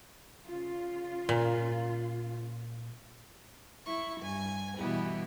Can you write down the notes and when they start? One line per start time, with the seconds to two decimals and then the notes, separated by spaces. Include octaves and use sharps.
0.47 C#3 F4
1.29 A#2
3.85 E4 C#6
4.21 G2 G#5 G#6
4.77 B2 E3 G3 B3 E4 G4